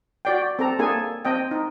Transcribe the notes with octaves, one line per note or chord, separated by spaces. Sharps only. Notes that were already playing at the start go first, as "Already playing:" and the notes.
F#4 D5 G5
C4 A4 A#5
A#3 D4 G#4 A4 G#5
C4 D#5 G5
D#4